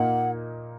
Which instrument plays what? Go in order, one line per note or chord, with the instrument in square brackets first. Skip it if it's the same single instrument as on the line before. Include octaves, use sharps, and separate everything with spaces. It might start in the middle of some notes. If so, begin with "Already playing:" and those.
Already playing: [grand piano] A#2 A#3 D#4 [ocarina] F#5